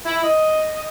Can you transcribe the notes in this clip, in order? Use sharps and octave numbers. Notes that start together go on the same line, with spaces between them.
E4
D#5